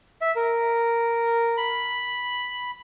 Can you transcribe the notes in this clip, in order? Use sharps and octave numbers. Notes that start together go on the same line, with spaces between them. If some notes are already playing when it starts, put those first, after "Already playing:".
E5
A#4
B5